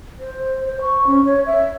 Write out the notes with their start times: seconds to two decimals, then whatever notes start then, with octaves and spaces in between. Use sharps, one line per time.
0.20 C5
0.65 C5
0.81 C#6
1.07 C#4
1.25 C#5
1.46 E5